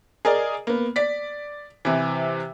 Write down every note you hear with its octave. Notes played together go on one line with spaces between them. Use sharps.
G#4 A#4 D5 D#5
A#3 B3
D5 B6
C3 E3